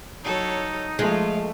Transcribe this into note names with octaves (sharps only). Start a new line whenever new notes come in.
F#3 D#4 A4 C#5
F3 G#3 A3 F4